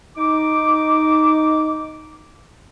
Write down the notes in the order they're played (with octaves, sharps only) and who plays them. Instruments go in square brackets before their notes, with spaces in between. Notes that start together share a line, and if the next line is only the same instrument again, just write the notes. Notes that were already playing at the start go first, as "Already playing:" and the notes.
[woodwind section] D#4 D6